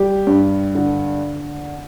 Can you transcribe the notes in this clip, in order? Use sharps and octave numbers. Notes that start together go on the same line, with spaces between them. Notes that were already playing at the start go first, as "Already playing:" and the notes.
Already playing: G3 G4
G2
D3